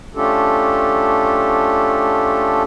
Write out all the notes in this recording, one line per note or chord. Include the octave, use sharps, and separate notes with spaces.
A3 C#4 D4 F4 G4 A4